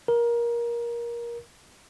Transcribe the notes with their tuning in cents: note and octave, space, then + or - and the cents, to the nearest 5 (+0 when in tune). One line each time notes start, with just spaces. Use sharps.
A#4 +20